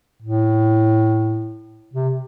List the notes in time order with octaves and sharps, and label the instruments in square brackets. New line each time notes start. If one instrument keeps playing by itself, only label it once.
[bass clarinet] A2
C3